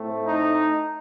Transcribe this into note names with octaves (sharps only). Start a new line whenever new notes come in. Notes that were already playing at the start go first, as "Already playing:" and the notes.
Already playing: A2 A3 C4
D#4